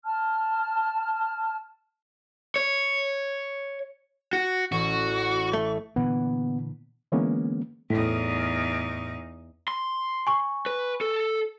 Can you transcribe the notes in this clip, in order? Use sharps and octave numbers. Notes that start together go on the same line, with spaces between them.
A5 F6
C#5
F#4
A1 F#4 C#6
A3
A#2 D3 E3 B3
D3 E3 G#3 A#3 B3 C#4
E2 A2 D#4
C6
G#5 C#6
B4
A4